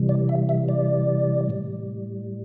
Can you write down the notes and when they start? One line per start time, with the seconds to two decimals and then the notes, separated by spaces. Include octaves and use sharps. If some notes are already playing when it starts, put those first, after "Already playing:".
Already playing: C3 E3 G3
0.09 D5
0.29 E5
0.49 E5
0.69 D5
1.49 A2 G3